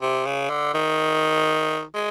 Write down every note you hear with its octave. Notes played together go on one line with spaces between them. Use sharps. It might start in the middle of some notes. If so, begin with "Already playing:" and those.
C3
C#3
D3
D#3
G#3